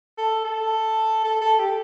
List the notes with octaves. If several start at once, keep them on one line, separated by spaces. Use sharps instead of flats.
A4
A4
A4
A4
G4